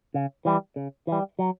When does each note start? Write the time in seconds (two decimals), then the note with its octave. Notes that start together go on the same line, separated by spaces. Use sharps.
0.14 C#3
0.45 E3 G3
0.76 C#3
1.07 E3
1.12 G3
1.39 F#3